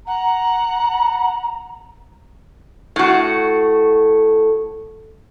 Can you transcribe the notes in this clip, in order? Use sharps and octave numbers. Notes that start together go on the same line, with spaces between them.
F#5 A#5
A2 F#4